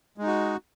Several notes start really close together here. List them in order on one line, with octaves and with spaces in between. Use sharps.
G#3 D#4 F#4